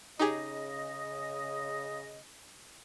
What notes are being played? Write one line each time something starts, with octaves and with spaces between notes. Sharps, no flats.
C#3 D#4 G4 G#4 D#5